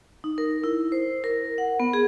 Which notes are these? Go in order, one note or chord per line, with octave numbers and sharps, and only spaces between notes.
D#4
A#4
E4
C5
A#4
F#5
B3
G#4